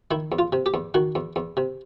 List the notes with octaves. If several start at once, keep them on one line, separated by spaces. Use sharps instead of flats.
D#3 E4
E2
F4
C3
G4
E2
D#3 F#4
E2
E2
C3